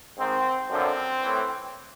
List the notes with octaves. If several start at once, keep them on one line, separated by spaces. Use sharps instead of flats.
G#2 D#3 C4
F#2 D3 F3 C4
A2 E3